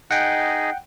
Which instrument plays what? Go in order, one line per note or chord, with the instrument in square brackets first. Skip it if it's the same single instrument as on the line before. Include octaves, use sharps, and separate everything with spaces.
[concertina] D#4 G#4 D#5 [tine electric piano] F#5 G5